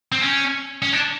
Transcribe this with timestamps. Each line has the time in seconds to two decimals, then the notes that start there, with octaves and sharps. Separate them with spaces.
0.12 C4
0.22 C#4
0.82 C#4
0.93 D4